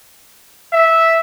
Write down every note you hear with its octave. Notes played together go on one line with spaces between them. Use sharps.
E5